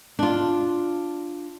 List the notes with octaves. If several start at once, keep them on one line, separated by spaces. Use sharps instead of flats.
D4 F4